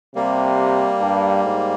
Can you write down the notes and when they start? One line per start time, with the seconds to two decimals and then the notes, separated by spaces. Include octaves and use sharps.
0.16 C3 G3 A#3
1.01 G2
1.45 G#2